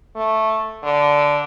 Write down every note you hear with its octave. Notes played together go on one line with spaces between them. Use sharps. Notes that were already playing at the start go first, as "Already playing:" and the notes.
A3
D3